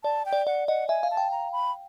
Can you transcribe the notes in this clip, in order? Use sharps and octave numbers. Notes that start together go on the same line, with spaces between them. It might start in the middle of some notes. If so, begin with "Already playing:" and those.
D5 A5
G5
D5
D5 F#5
D#5 F#5
E5 G#5
F5
A5
G5
A#5
B5